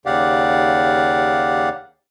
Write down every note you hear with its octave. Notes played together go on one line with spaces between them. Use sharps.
D#2 C#3 G4 D5 F5 F#5